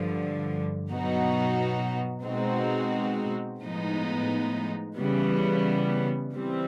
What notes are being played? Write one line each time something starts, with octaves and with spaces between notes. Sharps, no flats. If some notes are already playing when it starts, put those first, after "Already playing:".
Already playing: G2 D3 F3
B2 F#3 B3 D#4 F#4
B2 G#3 C4 D#4 F#4
A2 F3 G#3 B3 D#4
C#3 E3 G3 B3
E3 G3 C4